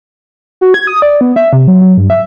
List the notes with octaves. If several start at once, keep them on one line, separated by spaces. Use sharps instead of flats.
F#4
G#6
D#6
D5
B3
E5
C3
F#3
F#3
G2
E5